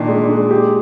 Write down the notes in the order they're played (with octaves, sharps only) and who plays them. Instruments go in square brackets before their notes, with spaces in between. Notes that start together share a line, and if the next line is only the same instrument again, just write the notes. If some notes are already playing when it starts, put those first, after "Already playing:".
Already playing: [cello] A#2 [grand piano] D#3 D4
[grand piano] G#3
G#3
G4